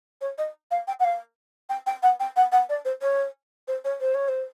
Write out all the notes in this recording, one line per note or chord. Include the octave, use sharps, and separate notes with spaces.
C#5
D#5
F5
G5
F#5
F5
G5
G5
F#5
G5
F#5
F#5
D5
C5
C#5
C5
C#5
C5
C#5
C5